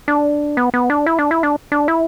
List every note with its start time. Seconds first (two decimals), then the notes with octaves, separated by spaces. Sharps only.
0.08 D4
0.57 B3
0.74 B3
0.90 D4
1.06 E4
1.19 D4
1.31 E4
1.43 D4
1.72 D4
1.88 E4